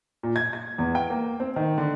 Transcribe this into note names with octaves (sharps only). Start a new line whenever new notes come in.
A#2
G#6
G#6
E2
G5
A#3
C4
D#3
D3